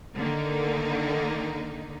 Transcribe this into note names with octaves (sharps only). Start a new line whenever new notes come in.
D3 D#3 A#3 D#4